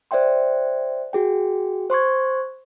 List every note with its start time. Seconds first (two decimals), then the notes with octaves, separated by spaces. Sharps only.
0.11 C5 D5 E5 G5 C6
1.13 F#4 G#4 G5
1.90 C5 C6 C#6 G#6